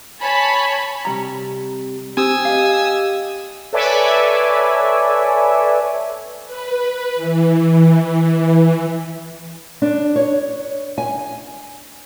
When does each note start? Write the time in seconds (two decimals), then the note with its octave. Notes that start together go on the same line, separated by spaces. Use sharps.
0.21 C#5 G#5 A5 B5
1.05 C3 G3 A#5
2.17 C4 G4 G#5 D#6 E6
2.45 D#5 F5
3.73 A4 B4 C#5 D5 E5 G#5
6.46 B4
7.16 E3
9.82 D4
10.16 C#5
10.98 G#5